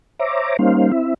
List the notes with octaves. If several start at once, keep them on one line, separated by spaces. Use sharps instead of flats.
C5 C#5 E5 A#5 D6
G3 A#3 C#4 D#4 C5 F5
C4 E4 E5